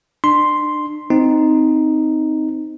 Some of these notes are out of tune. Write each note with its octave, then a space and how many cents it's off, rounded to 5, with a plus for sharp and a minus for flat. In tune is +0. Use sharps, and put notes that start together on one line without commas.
D4 +35 C6 +0
C4 -10 D#4 +0